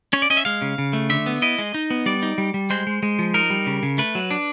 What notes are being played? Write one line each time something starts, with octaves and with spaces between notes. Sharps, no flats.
C#4 C#5
D5
C#4 D#5
E5
G#3 F5
C#3
C#3
A3
D3 E5
B3
E4 D#5
G#3
D#4
B3
G3 D5
D#4
G3
G3
G#3 C5
G#3
G#3
F3
D#4 A#4
G3
C#3
C#3
A3 B4
F#3
D4